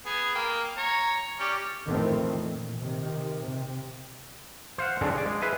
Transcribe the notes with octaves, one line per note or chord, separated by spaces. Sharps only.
B3 G#4
A#3 G5
C#5 A#5
C#4 G4 D5
F2 A2 D#3 E3 A3 C4
A#2
C3 D#3
C3
C5 F5 F#5
G#2 D3 F#3 G#3 C4 D4
G#4 D5
G#3
G#4 B4 E5 F5 G#5